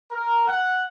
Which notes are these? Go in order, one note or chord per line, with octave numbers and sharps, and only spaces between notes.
A#4
F#5